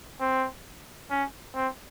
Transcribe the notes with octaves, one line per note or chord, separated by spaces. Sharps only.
C4
C#4
C4